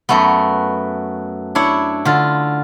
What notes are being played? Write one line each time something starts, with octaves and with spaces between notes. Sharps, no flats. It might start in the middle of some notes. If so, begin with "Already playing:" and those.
F#2 A3 B3
D4 E4 C#5
D3 F4